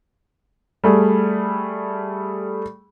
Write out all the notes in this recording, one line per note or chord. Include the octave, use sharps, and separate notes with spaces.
G3 A3 G#4